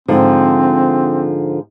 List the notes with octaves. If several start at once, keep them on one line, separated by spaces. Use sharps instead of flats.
G#2 D3 F3 C4